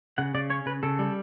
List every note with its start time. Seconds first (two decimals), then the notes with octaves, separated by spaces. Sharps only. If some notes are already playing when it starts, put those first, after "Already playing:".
0.18 C#3 F#5
0.35 C#3 D5
0.50 C#4 C#5
0.66 C#3 B4
0.83 C#3 A4
0.99 G3